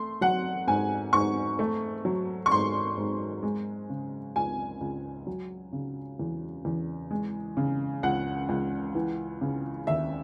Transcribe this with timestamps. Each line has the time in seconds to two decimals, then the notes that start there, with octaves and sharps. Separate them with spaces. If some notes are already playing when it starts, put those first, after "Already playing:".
Already playing: A3 C6
0.21 F#3 F#5
0.67 G#2 G#5
1.13 G#2 C#6
1.59 A3
2.05 F#3
2.46 C#6
2.51 G#2 C6
2.97 G#2
3.43 G#3
3.89 C#3
4.36 C#2 G#5
4.81 C#2
5.27 F#3
5.73 C#3
6.19 E2
6.65 E2
7.11 G#3
7.57 C#3
8.03 C#2 F#5
8.49 C#2
8.95 E3
9.41 C#3
9.87 D#2 E5